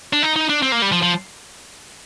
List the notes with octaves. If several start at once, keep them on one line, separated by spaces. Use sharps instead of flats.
D4
D#4
D#4
D4
C4
A#3
G3
F3
F3